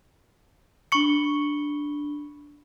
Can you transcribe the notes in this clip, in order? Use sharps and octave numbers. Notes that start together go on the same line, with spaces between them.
D4 B5 C#6 C#7 G7